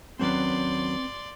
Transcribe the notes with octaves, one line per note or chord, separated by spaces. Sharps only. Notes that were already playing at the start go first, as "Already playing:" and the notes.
D#2 F#3 C4 C#4 B4 D5 C6